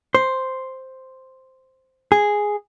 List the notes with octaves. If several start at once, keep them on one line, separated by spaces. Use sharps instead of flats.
C5
G#4